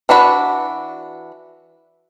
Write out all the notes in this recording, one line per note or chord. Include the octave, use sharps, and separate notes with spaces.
E3 D4 F#4 B5